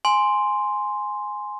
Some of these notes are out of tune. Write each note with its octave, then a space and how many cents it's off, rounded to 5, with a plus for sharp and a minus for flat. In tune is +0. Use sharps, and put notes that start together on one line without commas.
G#5 +0 C6 +0